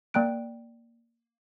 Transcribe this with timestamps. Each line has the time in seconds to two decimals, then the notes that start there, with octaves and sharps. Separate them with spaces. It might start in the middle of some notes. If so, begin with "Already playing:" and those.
0.14 A#3 D5 G5 A#5 F#6 D7